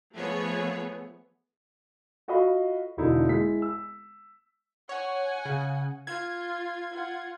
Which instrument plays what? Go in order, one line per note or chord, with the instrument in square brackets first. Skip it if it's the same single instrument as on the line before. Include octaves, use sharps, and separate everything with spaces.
[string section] F3 A3 B3 G#4 C#5
[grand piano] F4 F#4 A4 D#5 F5 B5
E1 D3 D#4 E4
G#3 E4 B6
E6
[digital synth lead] C#5 [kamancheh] F#5 G#5
[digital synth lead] C#3
[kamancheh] F4 [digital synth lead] G#6
[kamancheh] F4 F#5